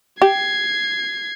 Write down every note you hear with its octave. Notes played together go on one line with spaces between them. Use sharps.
G4 G#6 C7